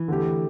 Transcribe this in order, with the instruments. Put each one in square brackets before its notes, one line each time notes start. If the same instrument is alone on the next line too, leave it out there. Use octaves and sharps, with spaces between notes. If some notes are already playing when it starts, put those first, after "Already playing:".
Already playing: [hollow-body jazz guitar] E3
[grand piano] D3 A3 G4